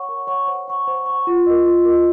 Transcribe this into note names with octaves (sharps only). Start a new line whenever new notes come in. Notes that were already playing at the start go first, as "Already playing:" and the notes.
Already playing: C#5 F#5 C#6
A#4
C#5 F#5 C#6
C5
F#5 C#6
C5
F#5 C#6
F4
A#4 D#5
F4
A#4 D#5